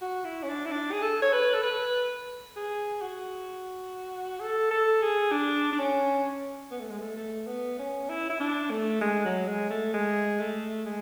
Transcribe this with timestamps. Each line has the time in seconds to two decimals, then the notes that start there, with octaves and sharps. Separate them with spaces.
0.02 F#4
0.25 E4
0.43 C#4
0.49 D4
0.65 E4
0.71 D4
0.92 G#4
1.02 A4
1.22 C#5
1.33 B4
1.54 A4
1.63 B4
2.56 G#4
3.01 F#4
4.40 A4
4.71 A4
5.02 G#4
5.32 D4
5.72 D4
5.79 C#4
6.71 B3
6.80 A3
6.90 G#3
6.99 A3
7.16 A3
7.47 B3
7.79 C#4
8.10 E4
8.30 E4
8.40 D4
8.71 A3
9.01 G#3
9.25 F#3
9.48 G#3
9.70 A3
9.94 G#3
10.40 A3
10.86 G#3